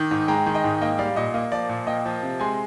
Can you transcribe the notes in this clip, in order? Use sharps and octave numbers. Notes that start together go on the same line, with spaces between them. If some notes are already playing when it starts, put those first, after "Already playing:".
Already playing: D#3 D6
G#2
G#3 G5 A#5
D#3
D#5 G5
G#2
A#3 D#5 G5
G3 D5 F5
A#2 D#5
A#3 D#5
F3 D5
A#2
A#3 D#5 G5
F3
C3
G#3 G#5 C6